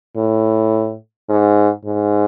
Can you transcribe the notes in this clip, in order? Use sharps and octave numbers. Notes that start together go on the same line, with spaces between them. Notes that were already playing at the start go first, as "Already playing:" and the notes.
A2
G#2
G#2